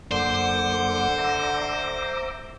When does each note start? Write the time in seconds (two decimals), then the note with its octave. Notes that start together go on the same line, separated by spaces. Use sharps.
0.11 F#2 D3 A#3 C5 F#5 D6
1.18 E5 A#5 D6